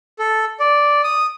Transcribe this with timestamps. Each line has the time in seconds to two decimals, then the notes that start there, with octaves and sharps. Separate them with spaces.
0.19 A4
0.60 D5
1.04 D#6